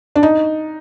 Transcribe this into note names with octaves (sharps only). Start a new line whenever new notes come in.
D4
D#4